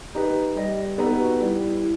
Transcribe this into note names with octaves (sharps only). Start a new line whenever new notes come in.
D#4 G4 B4
G3 D#5
B3 D#4 G4 A4 B4
F#4
G3 E4